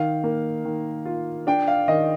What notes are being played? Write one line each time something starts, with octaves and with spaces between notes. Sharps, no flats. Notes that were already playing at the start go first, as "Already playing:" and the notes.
Already playing: D#3 F5
A#3
D#3
F4
D4 G5
F5
D#3 D#5